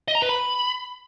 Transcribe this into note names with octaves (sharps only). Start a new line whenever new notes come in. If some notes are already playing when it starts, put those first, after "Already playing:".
D#5
A#5
B4
B5